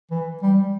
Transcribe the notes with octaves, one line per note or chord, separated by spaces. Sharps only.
E3
G3